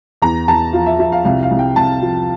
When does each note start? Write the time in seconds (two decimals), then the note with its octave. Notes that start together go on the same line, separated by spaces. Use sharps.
0.22 E2 A#5
0.48 E2 A5
0.73 F3 F5
0.86 E5
0.99 F3 E5
1.12 F5
1.25 C2 F5
1.43 F5
1.51 C2
1.59 G5
1.76 C2 A5
2.02 F3